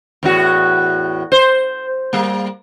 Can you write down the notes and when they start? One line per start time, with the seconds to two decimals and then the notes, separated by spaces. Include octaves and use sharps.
0.23 E2 A2 F#4
1.32 C5
2.13 G3 A#3